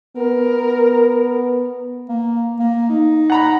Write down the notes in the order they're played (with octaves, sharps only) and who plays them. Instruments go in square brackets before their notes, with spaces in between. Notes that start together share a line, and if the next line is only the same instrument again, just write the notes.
[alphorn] B3 [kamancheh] A#4
[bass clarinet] A#3
A#3
D#4
[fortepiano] F#5 A#5 B5